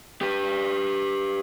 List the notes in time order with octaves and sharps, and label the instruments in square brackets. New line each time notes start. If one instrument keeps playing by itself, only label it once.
[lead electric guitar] G4 B4